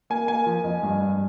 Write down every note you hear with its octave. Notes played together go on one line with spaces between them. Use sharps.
A#3 G#5
A#3 G#5
F3
F2
G2
G2